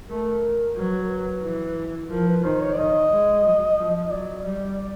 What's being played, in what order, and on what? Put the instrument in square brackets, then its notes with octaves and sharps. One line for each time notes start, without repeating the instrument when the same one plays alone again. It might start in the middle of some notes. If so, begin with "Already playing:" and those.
[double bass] A3 [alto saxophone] A#4
[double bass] F#3 [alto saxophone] B4
[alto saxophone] A#4
B4
[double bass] E3
[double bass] F3 [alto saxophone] A#4
[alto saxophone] B4
[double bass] D#3 [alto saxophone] C5
[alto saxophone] C#5
D5
[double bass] D#3 [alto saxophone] D#5
[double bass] G#3
F#3
F3
[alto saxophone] D#5
[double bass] F#3 [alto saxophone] D5
[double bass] G3